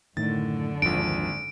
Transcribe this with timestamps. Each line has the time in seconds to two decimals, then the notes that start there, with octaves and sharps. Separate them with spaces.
0.17 F#2 A2 D3 D#3 A6
0.82 G#1 D#2 F3 D4 D7